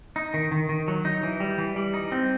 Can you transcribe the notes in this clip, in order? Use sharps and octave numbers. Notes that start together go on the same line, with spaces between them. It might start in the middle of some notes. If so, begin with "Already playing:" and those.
D#4
D#3
D#3
D#3
F#3
D#4
E3
G3
E3
G3
D#4
C4